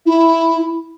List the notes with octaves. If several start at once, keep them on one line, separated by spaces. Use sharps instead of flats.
E4